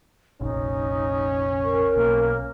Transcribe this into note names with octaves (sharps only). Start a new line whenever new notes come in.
F1 A#1 C#4 D#4
A#4 C#6
B1 A#3